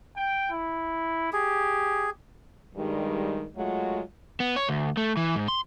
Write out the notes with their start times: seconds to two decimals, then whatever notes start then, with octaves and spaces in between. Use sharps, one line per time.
0.16 G5
0.51 E4
1.33 G4 G#4
2.76 G2 D#3 G3 G#3
3.56 F#3 G#3 A3 F4 F#4
4.40 B3
4.56 C#5
4.69 D2
4.97 A3
5.17 E3
5.36 G#2
5.48 C6